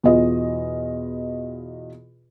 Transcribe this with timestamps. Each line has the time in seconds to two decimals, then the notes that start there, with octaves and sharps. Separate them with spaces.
0.03 E2 B2 F4 D#5